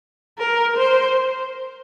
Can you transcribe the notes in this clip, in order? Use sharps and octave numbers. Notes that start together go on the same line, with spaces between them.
A#4
C5